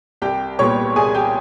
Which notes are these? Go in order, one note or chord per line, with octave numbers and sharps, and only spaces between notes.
C2 G4 G5
A#2 G3 B3 C#5 C#6
C2 G#4 G#5
G4 G5